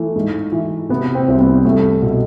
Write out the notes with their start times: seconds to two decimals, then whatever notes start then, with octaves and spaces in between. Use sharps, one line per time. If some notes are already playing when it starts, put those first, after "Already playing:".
Already playing: E3 A3
0.16 G#2
0.52 E3
0.89 C3 B3
1.15 C4
1.28 C2
1.40 B3
1.65 C2 A3
2.02 B2